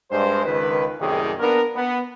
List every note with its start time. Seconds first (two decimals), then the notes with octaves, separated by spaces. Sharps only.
0.11 G2 G#3 C5
0.44 C#2 D#3 B4
1.00 C2 F#2 A2 D#3 G4 G#4
1.39 A#3 B3 D4 A#4
1.76 B3